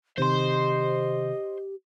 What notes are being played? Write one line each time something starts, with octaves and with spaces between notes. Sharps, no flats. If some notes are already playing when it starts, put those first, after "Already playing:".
C3 D#3 G4 C5 D#5 C6